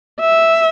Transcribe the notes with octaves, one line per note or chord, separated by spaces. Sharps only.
E5